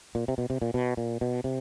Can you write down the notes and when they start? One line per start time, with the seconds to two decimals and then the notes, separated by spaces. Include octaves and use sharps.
0.15 A#2
0.28 C3
0.38 B2
0.50 C3
0.62 A#2
0.74 B2
0.97 A#2
1.21 B2
1.44 C3